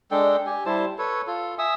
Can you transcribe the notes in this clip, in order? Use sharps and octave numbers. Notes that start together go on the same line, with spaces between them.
G#3 D4 A4 G5
G4 G#5
G3 E4 C5 A5
A4 B4 C#5
F4 A4
E5 G#5 D#6 E6